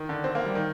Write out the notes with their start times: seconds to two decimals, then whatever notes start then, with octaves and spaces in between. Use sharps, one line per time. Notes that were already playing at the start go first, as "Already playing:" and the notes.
Already playing: D#3
0.09 D3
0.24 C4
0.35 A#3
0.45 G3
0.55 D#3